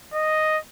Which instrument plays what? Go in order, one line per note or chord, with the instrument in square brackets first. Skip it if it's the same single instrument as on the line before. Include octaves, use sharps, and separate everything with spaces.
[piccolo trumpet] D#5